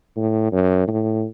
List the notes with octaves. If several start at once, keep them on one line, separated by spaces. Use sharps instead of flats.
A2
F#2
A2